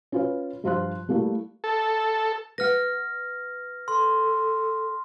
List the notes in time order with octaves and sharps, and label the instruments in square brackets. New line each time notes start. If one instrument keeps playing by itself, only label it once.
[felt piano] C#4 F4 B4
G2 F3 F4 C5 C6 F#6
G3 A3 A#3 E4
[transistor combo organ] A4
[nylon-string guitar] B4 F#5 [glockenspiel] F6 A#6
[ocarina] A4 [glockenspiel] C6